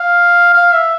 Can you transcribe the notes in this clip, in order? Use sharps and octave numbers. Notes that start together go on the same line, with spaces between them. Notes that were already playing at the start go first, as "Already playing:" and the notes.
Already playing: F5
F5
E5